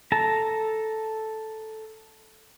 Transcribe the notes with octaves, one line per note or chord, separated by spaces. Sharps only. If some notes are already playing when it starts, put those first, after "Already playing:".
A4 A5 A#5